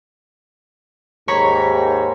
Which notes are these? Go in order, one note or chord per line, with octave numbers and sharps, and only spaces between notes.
D#2 G#2 C#5 A#5 B5